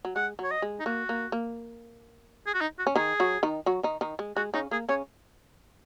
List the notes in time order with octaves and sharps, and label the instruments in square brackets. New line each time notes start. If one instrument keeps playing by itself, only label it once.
[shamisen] F#3
[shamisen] G#3 [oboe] F#5
[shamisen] F#3 [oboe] C#5
[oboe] D#5
[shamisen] G#3
[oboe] D#4
[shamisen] A#3 [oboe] F#4
[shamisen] A#3
A#3
[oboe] G#4
F#4
D#4
F#4
[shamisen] C#4
[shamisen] D#3 D#4 [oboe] G#4
[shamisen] F#3 F#4
D#3 D#4
F#3 F#4
D#3 D#4
D#3 D#4
G#3
[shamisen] G#3 [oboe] F#4
[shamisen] C#3 C#4 [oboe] D#4
[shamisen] A#3 [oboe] G#4
[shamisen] C#3 C#4 [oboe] C#5